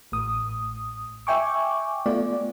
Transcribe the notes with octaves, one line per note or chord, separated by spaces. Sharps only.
A1 A2 D#6
E5 G5 G#5 C#6 D6
A3 B3 F4 D5